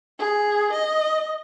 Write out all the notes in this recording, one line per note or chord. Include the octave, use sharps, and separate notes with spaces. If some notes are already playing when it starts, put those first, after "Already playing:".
G#4
D#5